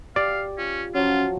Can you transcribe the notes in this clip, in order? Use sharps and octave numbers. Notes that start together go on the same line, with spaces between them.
G4 D5 F5
C#4 F4
F3 F#3 C#4 F4